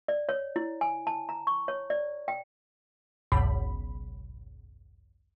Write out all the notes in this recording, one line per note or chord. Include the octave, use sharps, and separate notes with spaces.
D5
C#5
E4
G#5
A5
A#5
C#6
C#5
D5
G5
G#1 C#2 F#2 B2 B5